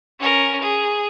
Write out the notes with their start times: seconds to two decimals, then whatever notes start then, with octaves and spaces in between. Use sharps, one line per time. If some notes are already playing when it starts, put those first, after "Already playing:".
0.19 C#4 A#4
0.61 G#4